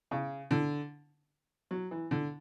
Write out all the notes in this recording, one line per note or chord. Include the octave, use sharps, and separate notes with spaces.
C#3
D3
F#3
E3
D3